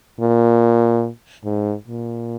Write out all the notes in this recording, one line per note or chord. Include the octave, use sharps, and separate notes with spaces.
A#2
G#2
A#2